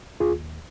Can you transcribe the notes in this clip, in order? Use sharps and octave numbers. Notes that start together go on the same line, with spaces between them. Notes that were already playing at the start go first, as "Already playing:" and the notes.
D#2 F4 G#4